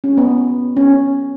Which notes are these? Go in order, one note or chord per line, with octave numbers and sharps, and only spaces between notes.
C#4
B3
C#4